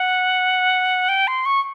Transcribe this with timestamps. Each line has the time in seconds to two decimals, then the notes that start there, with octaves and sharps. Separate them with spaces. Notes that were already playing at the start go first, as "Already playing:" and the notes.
Already playing: F#5
1.09 G5
1.28 C6
1.46 C#6